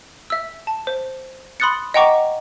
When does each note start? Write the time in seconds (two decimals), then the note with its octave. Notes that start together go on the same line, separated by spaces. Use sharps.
0.30 E5 E6
0.67 A5
0.87 C5
1.60 B5 C6 D#6 F#6 A6 C#7
1.94 D#5 F#5 G5 A#5 C#6 D6